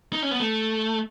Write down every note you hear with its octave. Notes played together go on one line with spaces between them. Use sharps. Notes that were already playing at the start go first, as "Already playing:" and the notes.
D#4
C#4
B3
A3